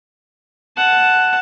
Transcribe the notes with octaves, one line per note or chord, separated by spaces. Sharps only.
F#5 A5